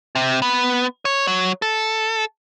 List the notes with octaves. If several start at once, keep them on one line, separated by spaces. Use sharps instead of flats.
C3
B3
C#5
F#3
A4